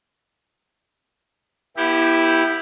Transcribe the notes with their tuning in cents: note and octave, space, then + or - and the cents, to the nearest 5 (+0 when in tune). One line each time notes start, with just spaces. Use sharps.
B3 -35 E4 +0 G4 +0